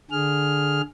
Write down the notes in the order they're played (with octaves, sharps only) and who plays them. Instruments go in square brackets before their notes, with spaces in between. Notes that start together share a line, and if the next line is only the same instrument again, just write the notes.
[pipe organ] D3 G#4 F6